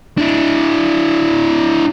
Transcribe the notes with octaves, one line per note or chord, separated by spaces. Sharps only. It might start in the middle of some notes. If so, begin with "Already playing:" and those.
D4 E4